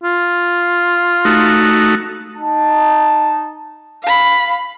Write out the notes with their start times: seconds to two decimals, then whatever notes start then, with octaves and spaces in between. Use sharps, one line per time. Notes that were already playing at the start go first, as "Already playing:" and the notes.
0.04 F4
1.25 A3 D#4 F#4
2.38 D#4 A5
4.03 F5 B5